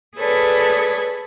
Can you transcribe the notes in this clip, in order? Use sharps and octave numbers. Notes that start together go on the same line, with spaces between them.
G#4 A4 B4 C#5 D5 A5